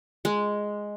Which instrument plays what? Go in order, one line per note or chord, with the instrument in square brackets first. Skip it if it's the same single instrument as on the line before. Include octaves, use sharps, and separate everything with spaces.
[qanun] G#3